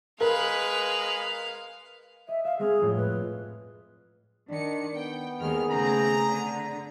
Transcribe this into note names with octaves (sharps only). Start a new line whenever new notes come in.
G#3 A#4 B4 F5
D#5 E5
E5 F5
G#3 C4 G#4 F6
F2 A2 G6
B4
D#3 D4 C#7
B3 G5
D#2 G#3 G#4 F6
C#3 A3 C4 A#5
D3